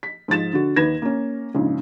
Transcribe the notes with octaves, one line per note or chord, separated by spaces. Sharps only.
B6
G#2 F3 A6 E7
D3 F#4
D#2 D#3 B4 G#6 A#6 E7
A#3 C#4
A#1 G#2 C#3